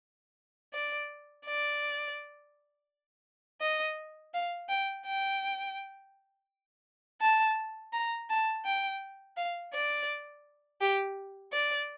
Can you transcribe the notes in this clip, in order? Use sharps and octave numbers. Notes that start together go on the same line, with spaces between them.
D5
D5
D#5
F5
G5
G5
A5
A#5
A5
G5
F5
D5
G4
D5